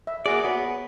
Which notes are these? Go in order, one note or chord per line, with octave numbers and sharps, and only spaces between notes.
E5
A#3 F#4 G#4 D5
B3 F#4 C#5